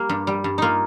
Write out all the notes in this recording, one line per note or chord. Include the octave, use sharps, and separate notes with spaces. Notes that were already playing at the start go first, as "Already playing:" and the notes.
Already playing: G3 A#3
G2
G3
G2
A#3 D#4 F4